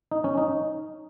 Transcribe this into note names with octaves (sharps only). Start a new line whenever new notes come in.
D#4
C#4
D#4